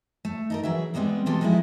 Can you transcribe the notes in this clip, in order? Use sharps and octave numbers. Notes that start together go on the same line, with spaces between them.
A3
D#4 A4 A#4
E3 F#3 G#4 E5
B2 G3 G#3 B3 C4
E3 G#3 F4 G4 A4
F3 G#3 A#3 B3 E4